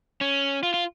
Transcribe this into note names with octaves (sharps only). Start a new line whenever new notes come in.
C#4
F4
F4